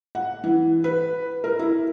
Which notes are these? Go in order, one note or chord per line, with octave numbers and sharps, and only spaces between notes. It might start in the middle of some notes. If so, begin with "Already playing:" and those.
F#5
E3
B4
A#4
E4